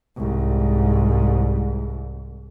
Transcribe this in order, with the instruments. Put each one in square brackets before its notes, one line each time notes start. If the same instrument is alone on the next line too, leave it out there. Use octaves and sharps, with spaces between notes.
[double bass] C2 G#2